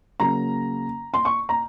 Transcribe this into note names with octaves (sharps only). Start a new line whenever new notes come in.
C#3 F#3 A#3 A#5
C6
C#6
A#5